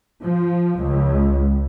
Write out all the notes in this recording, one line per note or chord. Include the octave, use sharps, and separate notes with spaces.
F3
C#2